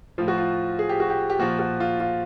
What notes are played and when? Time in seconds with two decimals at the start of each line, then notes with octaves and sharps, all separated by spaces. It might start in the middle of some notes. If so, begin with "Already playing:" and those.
0.18 A2 F3 F4
0.28 F#4
0.38 F4
0.79 G#4
0.89 G4
1.00 F#4
1.10 G4
1.30 G4
1.39 A#2 F3 F#4
1.59 F#4
1.80 F4
2.00 F4